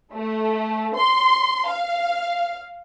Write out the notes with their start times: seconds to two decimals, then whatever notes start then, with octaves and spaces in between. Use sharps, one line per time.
0.12 A3
0.95 C6
1.66 F5